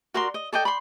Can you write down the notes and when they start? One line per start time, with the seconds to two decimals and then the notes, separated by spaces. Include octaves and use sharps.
0.14 F#4 A#4 D5 C6
0.34 D#5
0.53 A4 D5 D#5 G5
0.65 B5 C6